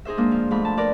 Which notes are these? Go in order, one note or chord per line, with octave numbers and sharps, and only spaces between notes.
D#4 G#4 C5 E5
G#3 A#3 D4
F3
G#2 F3 A3 B5
A5
A#4 B4 D5 B5